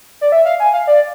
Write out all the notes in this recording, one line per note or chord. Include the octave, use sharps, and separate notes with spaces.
D5
E5
F5
G#5
F5
D5